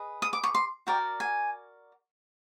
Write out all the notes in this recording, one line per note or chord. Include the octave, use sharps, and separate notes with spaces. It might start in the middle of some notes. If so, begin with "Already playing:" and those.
Already playing: G#4 B4 D#5
D#6
D6
C#6
C6
F#4 A#4 D5 G5
G#5